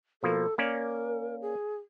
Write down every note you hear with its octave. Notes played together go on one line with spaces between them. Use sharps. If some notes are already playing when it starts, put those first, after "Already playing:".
B2 F3 A#3 A4
A#3 C#4 A#4 D5
G#4